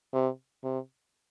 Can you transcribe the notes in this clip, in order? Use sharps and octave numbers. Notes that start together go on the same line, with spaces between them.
C3
C3